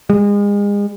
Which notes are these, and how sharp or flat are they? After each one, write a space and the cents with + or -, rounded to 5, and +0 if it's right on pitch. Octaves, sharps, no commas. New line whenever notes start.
G#3 -35